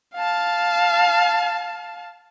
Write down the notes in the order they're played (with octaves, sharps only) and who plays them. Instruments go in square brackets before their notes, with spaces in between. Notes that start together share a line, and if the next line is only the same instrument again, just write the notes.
[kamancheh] F5 A5